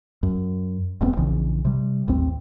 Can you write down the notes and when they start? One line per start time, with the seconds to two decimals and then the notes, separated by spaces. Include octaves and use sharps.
0.23 F#2
1.01 E1 G2 B3 C4
1.17 A#1 C#3 E3
1.65 C3 G3
2.08 A1 D#2 C4